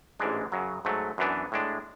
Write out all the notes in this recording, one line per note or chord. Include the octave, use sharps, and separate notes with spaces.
A1 G#2 E3 G#3 D4
F#2 C#3 F#3
G#2 F#3 A3
F#2 E3 B3 D4
A2 G#3 D4